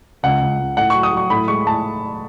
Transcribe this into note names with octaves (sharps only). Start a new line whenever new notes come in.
C#2 F#5
C#2
C#2
A2 F#5
C#6
F#3
D#6
F#3 C#6
A2 B5
G#3 C#6
A2 A5